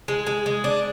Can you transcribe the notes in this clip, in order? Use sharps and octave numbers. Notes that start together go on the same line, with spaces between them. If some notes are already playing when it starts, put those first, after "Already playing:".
G#3
G#3
G#3
D4